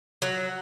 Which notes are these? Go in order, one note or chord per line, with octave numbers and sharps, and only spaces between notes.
F#3